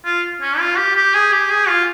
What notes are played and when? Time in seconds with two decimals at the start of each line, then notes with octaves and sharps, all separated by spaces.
0.05 F4
0.41 C#4
0.58 F4
0.77 G4
0.96 G4
1.14 G#4
1.32 G4
1.49 G#4
1.68 F4